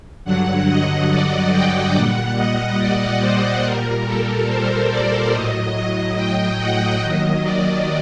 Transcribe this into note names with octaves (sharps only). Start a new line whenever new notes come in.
G2 D3 F#3 F#5
D#5
D5
G5
A#2 G3 F#5
D#5
D5
C5
A#2 G3 A#4
A4
C5
D5
A2 F#3 D#5
D#5
G5
F#5
D#2 D#3 F#3 D#5
D5